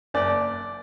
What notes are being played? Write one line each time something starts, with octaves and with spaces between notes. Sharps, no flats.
F#1 D5